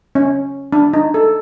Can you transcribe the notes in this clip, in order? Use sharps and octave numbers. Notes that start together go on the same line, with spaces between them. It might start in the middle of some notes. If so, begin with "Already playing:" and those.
C#4
D4
D#4
A4